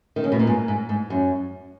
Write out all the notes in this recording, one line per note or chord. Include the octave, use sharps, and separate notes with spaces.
D#3
C#3
B2
A#2
G#2
G#2
G#2
F#2